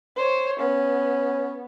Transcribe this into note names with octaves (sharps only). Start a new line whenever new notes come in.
C5 C#5
B3 C#4